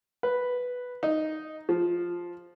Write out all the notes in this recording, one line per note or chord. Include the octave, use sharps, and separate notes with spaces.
B4
D#4
F3